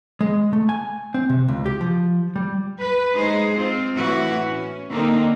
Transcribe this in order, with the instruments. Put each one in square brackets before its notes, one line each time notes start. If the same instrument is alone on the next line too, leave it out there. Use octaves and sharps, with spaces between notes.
[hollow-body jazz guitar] G#3
A3
G#5
C4
C3
C#2
G4
F3
G3
[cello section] B4
G#3 D#4 G#4 C5
C4 F4
A2 E3 E4 F#4
C#4
D3 A#3 C4 D#4